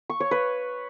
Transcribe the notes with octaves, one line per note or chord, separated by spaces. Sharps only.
C#6
C#5
B4